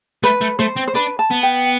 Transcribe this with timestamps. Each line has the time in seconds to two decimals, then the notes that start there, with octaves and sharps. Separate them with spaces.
0.23 A3 B4
0.41 A3
0.59 A3 C5
0.77 C4
0.88 C5
0.95 D4 B4
1.19 A5
1.31 B3
1.43 G5